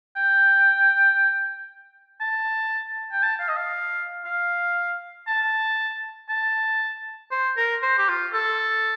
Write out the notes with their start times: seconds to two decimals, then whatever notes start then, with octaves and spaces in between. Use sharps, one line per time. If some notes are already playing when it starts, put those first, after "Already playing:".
0.16 G5
2.21 A5
3.12 G5
3.22 A5
3.39 F5
3.48 D#5
3.56 F5
4.25 F5
5.27 A5
6.29 A5
7.31 C5
7.57 A#4
7.82 C5
7.98 G4
8.09 F4
8.33 A4